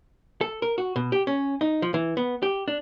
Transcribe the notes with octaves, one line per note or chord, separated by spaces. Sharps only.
A4
A#4
F#4
B2
G4
C#4
D#4
F3
E3
B3
G4
D4